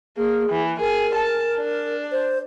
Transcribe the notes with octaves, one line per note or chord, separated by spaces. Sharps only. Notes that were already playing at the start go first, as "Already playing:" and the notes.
A#3 G#4
E3
G#4 A#4
A5
D4
C5